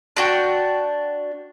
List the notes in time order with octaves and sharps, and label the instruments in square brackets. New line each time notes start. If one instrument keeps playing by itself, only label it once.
[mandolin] D4 F#4 G5